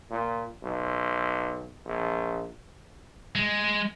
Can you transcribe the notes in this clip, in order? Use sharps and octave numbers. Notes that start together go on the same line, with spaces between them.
A#2
B1
A#1
G#3